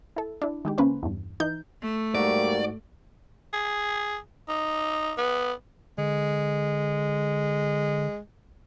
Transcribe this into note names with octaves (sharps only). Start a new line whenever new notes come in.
E4 A4
D4 E4
D#3 G#3 G4
C#3 A#3 C#4 B4 C5
E2 G2
E3 D#4 G6
A3
G#2 G3 A#3 F#4 D5
G#4
D#4
B3
D3 G#3